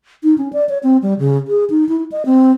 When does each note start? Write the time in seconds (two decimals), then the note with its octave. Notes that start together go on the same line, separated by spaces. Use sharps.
0.23 D#4
0.38 C#4
0.53 D5
0.69 C#5
0.83 C4
1.02 G3
1.19 C#3
1.48 G#4
1.70 D#4
1.89 E4
2.12 D#5
2.26 C4